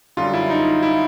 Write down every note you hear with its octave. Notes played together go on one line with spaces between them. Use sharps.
F#2 D3 G3 F4
E4
D#4
E4